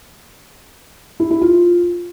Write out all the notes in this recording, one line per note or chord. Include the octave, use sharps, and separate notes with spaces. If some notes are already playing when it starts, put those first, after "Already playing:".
E4
E4
F4